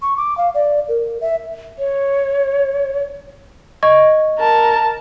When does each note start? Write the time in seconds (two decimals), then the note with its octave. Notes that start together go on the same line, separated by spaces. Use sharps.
0.02 C#6
0.17 D6
0.38 F5
0.55 D5
0.89 A#4
1.21 E5
1.79 C#5
3.83 D#5 C#6 G#6
4.39 A#4 A5